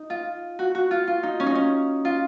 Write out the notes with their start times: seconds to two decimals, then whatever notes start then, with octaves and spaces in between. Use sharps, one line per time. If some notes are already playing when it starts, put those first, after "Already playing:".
Already playing: D#4
0.10 F4
0.59 F#4
0.75 F#4
0.91 F4
1.07 F4
1.23 D#4
1.40 C#4
1.46 D#4
1.55 C#4
2.05 F4